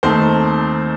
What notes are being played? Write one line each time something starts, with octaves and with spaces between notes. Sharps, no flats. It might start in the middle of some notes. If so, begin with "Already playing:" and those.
D#2 D#3 A3 C4 C5